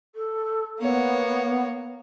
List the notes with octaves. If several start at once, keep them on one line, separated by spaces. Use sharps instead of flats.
A4
A#3 B3 C#5